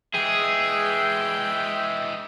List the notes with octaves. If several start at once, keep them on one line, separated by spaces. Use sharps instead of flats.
E3 G#3 G#4 E5 G5